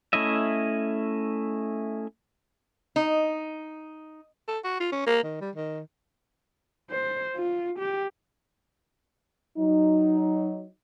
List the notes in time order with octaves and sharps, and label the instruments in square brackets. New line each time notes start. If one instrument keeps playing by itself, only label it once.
[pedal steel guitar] A3 C#4 E4 D#5 E5
[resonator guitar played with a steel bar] D#4
[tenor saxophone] A4
F#4
F4
C#4
A#3
D#3
G3
D#3
[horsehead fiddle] C5
F4
G4
[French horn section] F#3 D#4